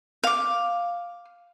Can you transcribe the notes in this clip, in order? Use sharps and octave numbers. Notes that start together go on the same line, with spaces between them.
F5 D6